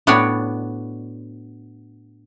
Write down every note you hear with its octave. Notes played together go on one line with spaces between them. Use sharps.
A2 B3 D4 F#4 C#5 D5